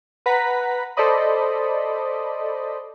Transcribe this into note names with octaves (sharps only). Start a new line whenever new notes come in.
B4 F#5 A#5 B6
A4 C5 D5 D#5 B5